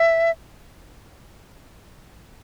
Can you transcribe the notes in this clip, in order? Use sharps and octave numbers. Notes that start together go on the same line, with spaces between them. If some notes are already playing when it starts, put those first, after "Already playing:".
Already playing: E5